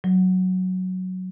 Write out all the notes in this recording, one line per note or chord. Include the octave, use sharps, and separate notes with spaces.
F#3